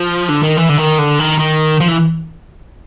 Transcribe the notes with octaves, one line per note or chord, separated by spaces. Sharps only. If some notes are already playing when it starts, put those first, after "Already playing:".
Already playing: F3
D3
D#3
E3
D3
D#3
D3
D#3
D#3
F3
E3